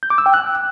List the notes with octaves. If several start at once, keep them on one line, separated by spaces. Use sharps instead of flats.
G6
D6
E6
G5
F#6